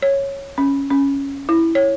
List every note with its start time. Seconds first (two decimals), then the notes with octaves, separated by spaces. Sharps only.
0.02 C#5
0.58 C#4
0.90 C#4
1.49 E4
1.75 C#5